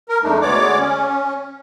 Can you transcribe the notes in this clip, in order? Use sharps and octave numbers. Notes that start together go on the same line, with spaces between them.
A#4
F2 G#3 A3 D4 D#4
D2 G#3 B3 C#5 D5 D6
C#4